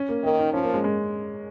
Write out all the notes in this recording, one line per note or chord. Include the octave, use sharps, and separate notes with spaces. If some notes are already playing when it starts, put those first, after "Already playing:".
Already playing: C#4
A#3
D#3 A#3
D#4
F3 C#4
A#3
G#3
G#3